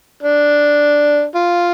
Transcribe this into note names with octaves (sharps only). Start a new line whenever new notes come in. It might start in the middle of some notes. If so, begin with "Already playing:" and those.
D4
F4